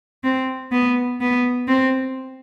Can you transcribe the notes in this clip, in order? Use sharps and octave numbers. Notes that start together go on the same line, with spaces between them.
C4
B3
B3
C4